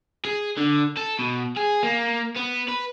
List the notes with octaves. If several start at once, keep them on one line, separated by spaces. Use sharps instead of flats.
G#4
D3
A4
B2
G#4
A#3
B3
B4